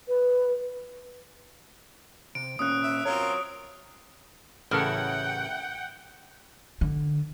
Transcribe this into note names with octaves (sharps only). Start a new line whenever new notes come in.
B4
C3 D7
A#2 C#4 D#6 F#6
E5
C4 F4 F#4 A#4 C#5
A1 C#3 E4 A4 A#4 F#5 G5 F6
D3